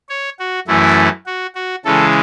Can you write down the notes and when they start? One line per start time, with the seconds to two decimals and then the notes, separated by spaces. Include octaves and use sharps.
0.09 C#5
0.39 F#4
0.68 F#2 E3 A3 E4
1.26 F#4
1.55 F#4
1.85 C#3 E3 G#3 A4